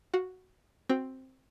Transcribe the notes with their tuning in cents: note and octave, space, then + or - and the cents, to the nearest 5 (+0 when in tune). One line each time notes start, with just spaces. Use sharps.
F#4 +0 F5 +30
C4 +5 F#4 +0